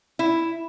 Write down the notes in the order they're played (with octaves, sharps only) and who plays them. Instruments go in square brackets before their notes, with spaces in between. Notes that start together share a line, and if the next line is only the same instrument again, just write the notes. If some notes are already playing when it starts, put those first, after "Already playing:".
[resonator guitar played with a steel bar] E4